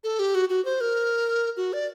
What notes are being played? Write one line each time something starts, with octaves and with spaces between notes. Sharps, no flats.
A4
G4
F#4
F#4
C5
A#4
F#4
D5